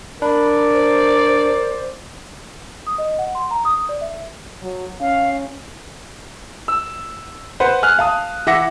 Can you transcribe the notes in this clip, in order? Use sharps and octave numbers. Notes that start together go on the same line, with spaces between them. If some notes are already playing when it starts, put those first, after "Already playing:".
D4 A#4 D5 B5
C5
D#6
D#5
F#5
C6
A#5
D#6
D5
E5
F#3
C#4 F5
E6
B4 C5 F#5
G#5 F6 F#6
F5 A5 D#6
E3 E5 F#5 D6 A#6 C#7